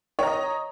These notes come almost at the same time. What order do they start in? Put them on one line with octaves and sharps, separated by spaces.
C#5 A#5 D#5